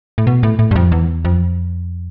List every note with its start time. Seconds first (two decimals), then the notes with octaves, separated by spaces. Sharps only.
0.18 A2
0.27 B2
0.43 A2
0.59 A2
0.71 G2
0.76 F2
0.92 E2
1.25 F2